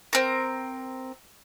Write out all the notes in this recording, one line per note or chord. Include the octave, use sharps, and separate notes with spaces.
C4 A#4